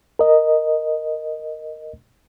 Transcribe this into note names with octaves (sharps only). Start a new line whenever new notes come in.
A#4 D#5